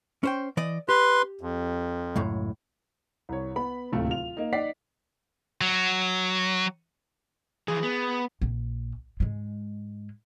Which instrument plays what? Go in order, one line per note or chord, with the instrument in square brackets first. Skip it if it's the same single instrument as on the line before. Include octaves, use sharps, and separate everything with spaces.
[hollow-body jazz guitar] C#4 C5 G5
E3 D5 D#5
[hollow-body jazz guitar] G4 [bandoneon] B4 C6
[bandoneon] F2
[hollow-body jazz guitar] C#2 F#2 A2
[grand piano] C2 C#5
B3 B5
D1 D#2 C3 A3 C4 F4
F4 F7
A#3 D#4
D#4 D5 F#5 B6 C7
[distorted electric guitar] F#3
[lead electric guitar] E3 F3 [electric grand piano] G#4
[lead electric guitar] B3
[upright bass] A#1
G#2 G#3